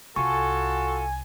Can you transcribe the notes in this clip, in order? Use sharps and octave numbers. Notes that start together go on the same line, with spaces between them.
C2 F4 F#4 A4 G#5 C#6